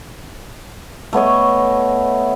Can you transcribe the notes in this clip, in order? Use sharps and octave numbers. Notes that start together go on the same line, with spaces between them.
A3 B3 C#5 D#5